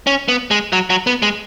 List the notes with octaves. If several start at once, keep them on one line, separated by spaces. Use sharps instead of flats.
C#4
B3
G#3
F#3
F#3
B3
G#3